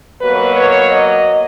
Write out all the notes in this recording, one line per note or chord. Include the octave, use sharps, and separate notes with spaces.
B2 F#3 A#3 B4
C#5
D#5